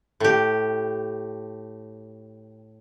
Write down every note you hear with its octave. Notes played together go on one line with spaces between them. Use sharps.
A2 G4